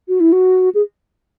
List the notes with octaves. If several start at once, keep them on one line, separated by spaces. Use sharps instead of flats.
F#4
E4
F#4
G#4